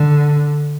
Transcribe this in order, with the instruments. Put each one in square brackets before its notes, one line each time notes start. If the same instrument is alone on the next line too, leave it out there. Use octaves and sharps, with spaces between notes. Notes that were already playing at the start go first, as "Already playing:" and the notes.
Already playing: [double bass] D3